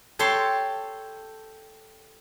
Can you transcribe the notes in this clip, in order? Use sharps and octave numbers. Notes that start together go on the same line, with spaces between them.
G4 A4 C#5 A5 C6